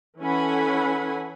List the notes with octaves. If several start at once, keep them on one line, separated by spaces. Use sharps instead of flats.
E3 C#4 A4 F#5 G#5 B5